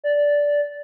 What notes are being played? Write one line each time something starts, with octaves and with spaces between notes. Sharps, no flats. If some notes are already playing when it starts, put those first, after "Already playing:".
D5